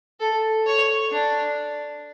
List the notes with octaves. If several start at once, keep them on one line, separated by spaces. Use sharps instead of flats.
A4
C#5
D4